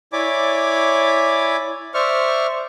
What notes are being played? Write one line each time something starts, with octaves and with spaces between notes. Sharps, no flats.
E4 C#5 D5 G#5 B5 D6
C5 D5 E5 C#6 F6